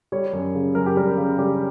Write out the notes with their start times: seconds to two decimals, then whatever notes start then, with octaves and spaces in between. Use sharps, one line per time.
0.12 G3 C#5
0.33 F#2
0.55 C#3
0.75 F#2 A#4
0.86 G4
0.97 G3 A#4
1.17 C#3
1.38 G3 G4